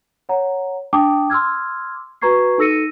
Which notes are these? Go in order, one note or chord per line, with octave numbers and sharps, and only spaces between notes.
C#5 F#5 A#5
D4 G5 A5 D6 D#6
C6 D6 E6 F6 G#6
F#4 B4 A#5 C#6 G#6 C7
D#4 A4 E6 A#6 C#7 D#7